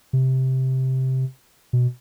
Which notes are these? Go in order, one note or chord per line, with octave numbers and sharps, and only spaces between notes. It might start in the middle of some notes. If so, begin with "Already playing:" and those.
C3
B2